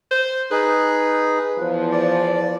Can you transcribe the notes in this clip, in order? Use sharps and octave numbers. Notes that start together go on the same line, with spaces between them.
C5
D#4 G#4 B4
E2 F3
D5